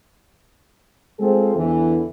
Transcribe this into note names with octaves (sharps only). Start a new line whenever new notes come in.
G#3 C4 F4 G#4 A4 C5
E2 D3 E3